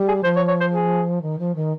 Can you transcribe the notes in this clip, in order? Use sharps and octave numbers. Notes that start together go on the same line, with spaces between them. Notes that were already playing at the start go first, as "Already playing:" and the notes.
Already playing: G3
G#4
F3 C5
C#5
C#5
C5
G#4
D#3
F3
D#3